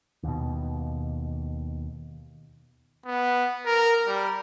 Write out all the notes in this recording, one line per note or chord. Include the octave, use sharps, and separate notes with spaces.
D#2 B2
B3
A#4
G3